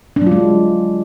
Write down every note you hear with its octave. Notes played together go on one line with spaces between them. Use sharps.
D4
F#3
F4
G#3